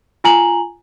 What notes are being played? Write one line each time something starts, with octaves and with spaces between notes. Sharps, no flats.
F4 G#5 A#5 F#7